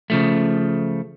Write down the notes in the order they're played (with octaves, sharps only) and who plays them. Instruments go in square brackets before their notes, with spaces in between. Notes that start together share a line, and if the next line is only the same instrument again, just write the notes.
[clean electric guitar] C#3 F3 A3